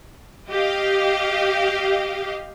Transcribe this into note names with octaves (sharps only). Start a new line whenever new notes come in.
G4 D#5 F5